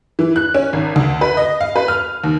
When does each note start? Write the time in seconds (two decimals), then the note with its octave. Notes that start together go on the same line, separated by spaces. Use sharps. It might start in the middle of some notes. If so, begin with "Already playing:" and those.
0.19 E3
0.36 F#6
0.54 C#4
0.73 G#1
0.96 D2
1.21 B4
1.37 D#5
1.61 F5
1.76 B4
1.88 F6
2.24 D#2